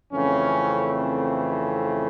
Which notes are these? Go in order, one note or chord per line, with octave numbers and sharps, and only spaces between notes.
F2 C#3 E3 A3 C4 C#4